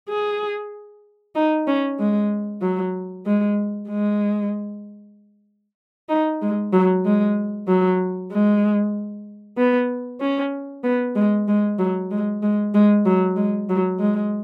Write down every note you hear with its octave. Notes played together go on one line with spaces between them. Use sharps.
G#4
D#4
C#4
G#3
F#3
G#3
G#3
D#4
G#3
F#3
G#3
F#3
G#3
B3
C#4
B3
G#3
G#3
F#3
G#3
G#3
G#3
F#3
G#3
F#3
G#3